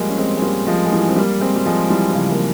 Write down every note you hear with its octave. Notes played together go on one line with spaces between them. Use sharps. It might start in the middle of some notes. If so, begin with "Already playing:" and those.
Already playing: F3 G3 G#3 A#3
C#4
G#3 C4
G#3
G3 A#3
F3 G#3
G#3
E3 G3
C4
G3 A#3
G#3 C4
G3
F3 G#3
E3 G3
E3
C#3 F3
A#3